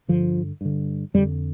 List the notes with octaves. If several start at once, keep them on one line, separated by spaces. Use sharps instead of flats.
G2 D3 F3
G2 D3
F2 D3 G3